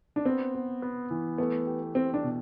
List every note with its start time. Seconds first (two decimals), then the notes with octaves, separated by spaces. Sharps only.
0.16 D4
0.25 B3 C4
0.55 B3
0.82 B3
1.10 E3
1.38 A3 B3
1.67 G4
1.95 C4 G4
2.14 D4
2.23 B2